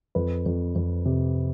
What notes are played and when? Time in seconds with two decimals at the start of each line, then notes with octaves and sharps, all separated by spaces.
0.15 F2 B4
0.46 F2
0.75 F2
1.06 C3